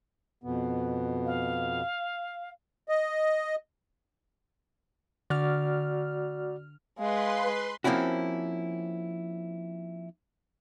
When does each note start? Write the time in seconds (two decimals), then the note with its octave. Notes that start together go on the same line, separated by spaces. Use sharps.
0.44 F2 B2 B3
1.25 F5
2.89 D#5
5.30 D3 F#4 D5 F6
6.98 G#3 B4 F5 C6
7.84 F3 A#3 C4 C#4 E4 F#4